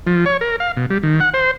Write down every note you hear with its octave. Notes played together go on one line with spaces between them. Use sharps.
F3
C#5
A#4
F5
B2
G3
D#3
F#5
C5